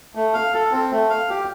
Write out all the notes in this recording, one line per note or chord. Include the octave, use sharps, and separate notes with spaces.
A3
F5
A4
C4
A3
F5
G4